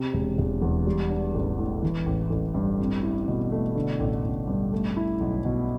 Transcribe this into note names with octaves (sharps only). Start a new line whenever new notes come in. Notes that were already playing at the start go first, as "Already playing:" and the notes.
Already playing: C3
E1
E1
E2
G3
D4
A1
A2
E3
A1
A1
G2
C4
E4
B2
A3
D3
A1
A1
G2
A3
E4
B1
B2